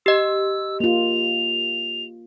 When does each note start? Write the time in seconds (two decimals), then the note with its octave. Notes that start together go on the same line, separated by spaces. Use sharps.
0.06 G4 D#5 E6
0.80 A#3 F4 F7